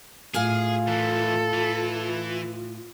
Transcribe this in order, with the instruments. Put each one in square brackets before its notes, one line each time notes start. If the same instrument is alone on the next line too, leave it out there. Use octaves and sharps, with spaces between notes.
[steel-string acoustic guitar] A2 F5 G#5 [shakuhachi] F4 [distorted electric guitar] G#4
[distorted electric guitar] A#2 E3 [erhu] A4
[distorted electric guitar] E3